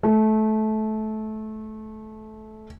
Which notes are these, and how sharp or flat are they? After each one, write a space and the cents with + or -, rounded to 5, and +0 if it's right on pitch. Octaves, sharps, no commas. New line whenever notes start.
A3 -20